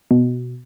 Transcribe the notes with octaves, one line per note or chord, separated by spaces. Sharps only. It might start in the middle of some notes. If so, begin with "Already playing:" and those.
B2